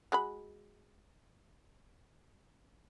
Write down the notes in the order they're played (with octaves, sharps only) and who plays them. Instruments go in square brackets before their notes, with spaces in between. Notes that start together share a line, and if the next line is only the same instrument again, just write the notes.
[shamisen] G#3 F#4 B5